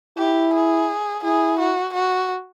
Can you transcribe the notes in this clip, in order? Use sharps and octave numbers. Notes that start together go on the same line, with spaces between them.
E4 G4
G#4
E4 G#4
F#4
F#4